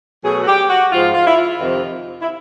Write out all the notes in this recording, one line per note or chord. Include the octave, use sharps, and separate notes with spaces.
B2 F#3 A3 G#4
F#4
G4
F#4
G#2 F3 G#3 F4
F4
E4
F4
F2 C3 D#3
E4